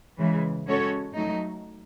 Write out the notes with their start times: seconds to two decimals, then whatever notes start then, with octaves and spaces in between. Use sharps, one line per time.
0.18 C#3 E3 G#3
0.67 G#3 C#4 F#4 A4 C#5
1.14 F#3 A3 D#4